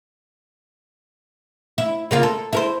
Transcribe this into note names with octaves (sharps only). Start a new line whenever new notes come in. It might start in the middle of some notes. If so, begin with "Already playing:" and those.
E4
C#3 A#3 F4
A4
E4 A#4 C5